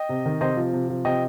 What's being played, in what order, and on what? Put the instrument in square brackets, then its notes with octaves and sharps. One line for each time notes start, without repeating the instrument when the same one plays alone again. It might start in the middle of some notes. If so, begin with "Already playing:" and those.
Already playing: [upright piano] D#5 G5
C3
D#3
C3 C5 D#5
F3
C3
F3
C3 D#5 G5